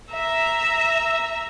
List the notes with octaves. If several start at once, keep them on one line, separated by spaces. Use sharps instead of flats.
E5 A#5